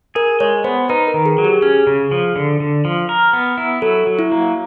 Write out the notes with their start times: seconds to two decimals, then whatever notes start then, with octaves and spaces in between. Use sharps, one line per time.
0.15 G#4 A#4
0.40 G#3 C#5
0.64 B3 C5
0.89 D#4 B4
1.07 A#4
1.14 D#3
1.26 G#4
1.38 F#3
1.45 G4
1.62 C#4 G#4
1.87 C#3
2.11 F3
2.36 D3
2.60 D3
2.85 F3
3.09 A#4
3.33 B3
3.58 E4
3.82 F#3 A4
4.07 F#3
4.19 E4
4.32 A#3